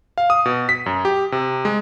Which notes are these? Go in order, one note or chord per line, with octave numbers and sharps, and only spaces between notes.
F5
D#6
B2
B6
F#2
G4
C3
G#3